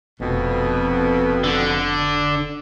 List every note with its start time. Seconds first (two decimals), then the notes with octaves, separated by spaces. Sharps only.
0.20 F1 F2 B2
1.44 D3